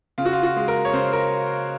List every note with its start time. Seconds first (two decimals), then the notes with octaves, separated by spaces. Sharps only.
0.18 C#3 F4
0.26 F#4
0.33 F4
0.43 F#4
0.56 G#3
0.68 A#4
0.85 C#5
0.94 C#3 C5
1.13 A#4